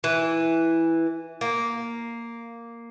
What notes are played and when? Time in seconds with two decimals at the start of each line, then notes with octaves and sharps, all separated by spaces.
0.04 E3
1.41 A#3